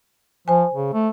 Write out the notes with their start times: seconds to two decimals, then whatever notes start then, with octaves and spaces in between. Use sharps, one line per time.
0.48 F3 C5 G#5
0.74 C#3
0.93 A3